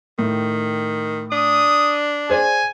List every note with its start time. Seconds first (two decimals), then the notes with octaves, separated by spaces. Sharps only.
0.19 A2 D#3
1.32 D4 D#6
2.29 G#4 C5 D5 G#5